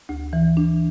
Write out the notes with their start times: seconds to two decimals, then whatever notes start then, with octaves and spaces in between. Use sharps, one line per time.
0.09 D2
0.33 E3
0.57 D4